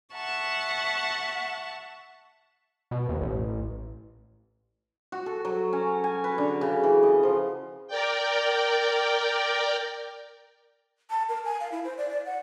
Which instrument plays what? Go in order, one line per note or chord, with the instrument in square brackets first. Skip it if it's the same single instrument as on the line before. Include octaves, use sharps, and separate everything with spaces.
[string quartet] E5 F#5 A5 C#6
[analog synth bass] B2
D#2
A1
[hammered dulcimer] F#4
A4
F#3
C#4
G#5
B4
D3
C#3
E3
D#5
F3
[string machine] A#4 D5 G5
[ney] A5
A#4
G#5
F5
E4
C5
D5
D5
F#5